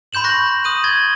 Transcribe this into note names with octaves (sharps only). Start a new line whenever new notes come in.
B5 C6 G6 E7 F#7
C#6 F#6 G6 A#6 F#7
D#6 F#6 D#7 F#7
G#6 A6 F#7 G7